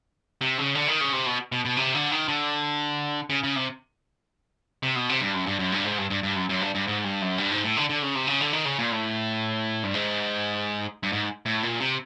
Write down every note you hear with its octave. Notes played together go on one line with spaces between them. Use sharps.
C3
C#3
D3
D#3
C#3
C3
B2
B2
B2
C3
D3
D#3
D3
C#3
C#3
C3
C3
B2
C3
G2
F#2
G2
F#2
G2
G#2
G2
G2
G2
F#2
F#2
G2
G2
G#2
G2
F#2
G2
G#2
A2
D3
D3
C#3
C3
C#3
D3
D#3
C#3
A#2
A2
G2
G#2
G2
G#2
A2
A#2
C3